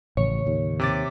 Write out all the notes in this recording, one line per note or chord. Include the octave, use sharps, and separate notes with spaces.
A1 A2 C#3 F3 C#5
D#2
C3 D6 A6